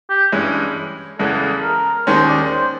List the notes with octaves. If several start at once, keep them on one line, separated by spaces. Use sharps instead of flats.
G4
G2 E3 G#3 C#4
E2 C#3 E3 G#3 A4
A#4
D#2 D#3 G#3 C#4 C5
D5
C5